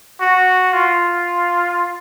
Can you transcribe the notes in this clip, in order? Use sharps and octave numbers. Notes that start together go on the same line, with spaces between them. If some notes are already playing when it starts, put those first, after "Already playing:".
F#4
F4